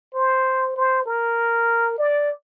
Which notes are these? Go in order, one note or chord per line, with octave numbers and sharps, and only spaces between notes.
C5
C5
A#4
D5